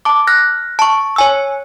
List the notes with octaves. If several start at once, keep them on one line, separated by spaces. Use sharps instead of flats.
A5 D6
F6 F#6 A#6
A5 C#6
C#5 G#5 E6